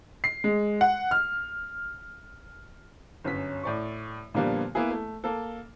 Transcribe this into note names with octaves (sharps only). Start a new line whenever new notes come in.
C7
G#3
F#5
F6
G1 F#2 C#4 B6
A2 D5 C#6
A#2 D3 F3 G3 A#3 B3
A#3 B3 E4 G#4
A3
A#3 A4